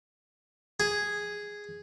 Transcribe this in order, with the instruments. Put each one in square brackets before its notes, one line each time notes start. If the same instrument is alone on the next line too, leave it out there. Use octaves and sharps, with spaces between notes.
[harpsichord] G#4